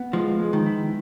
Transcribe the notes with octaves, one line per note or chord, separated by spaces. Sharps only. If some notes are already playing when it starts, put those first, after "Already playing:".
Already playing: B3
F3 G#3
G#3
D#3
E4